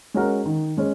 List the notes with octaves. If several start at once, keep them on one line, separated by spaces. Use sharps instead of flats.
G#3 C#4 F#4 A#4
D#3
G#3 C#4